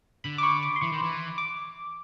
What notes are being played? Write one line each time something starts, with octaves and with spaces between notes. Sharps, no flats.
D3 B5
D6
C#6
D6
C6
E3 C#6
D#3
E3
D6